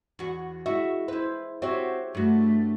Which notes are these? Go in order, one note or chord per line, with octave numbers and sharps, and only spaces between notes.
E2 F#4
G#3 E4 F#4 E5
E4 B4 C5
C4 F#4 G4 C#5 E5
G2 A3 F#4